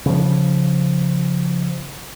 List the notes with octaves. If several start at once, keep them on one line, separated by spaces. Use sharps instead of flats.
C#3 F3